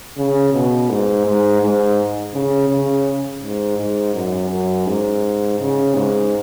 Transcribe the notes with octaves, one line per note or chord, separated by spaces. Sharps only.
C#3
B2
G#2
G#2
G#2
C#3
C#3
G#2
G#2
F#2
F#2
G#2
C#3
G#2